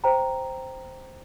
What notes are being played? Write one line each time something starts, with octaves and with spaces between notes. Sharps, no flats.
C5 G5 A#5